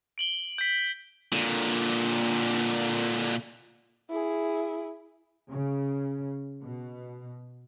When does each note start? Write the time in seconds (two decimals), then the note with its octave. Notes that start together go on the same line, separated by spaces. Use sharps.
0.18 D7 F#7 G7
0.58 G6 B6
1.32 A#2 D3
4.10 E4 G#4
5.48 C#3
6.61 B2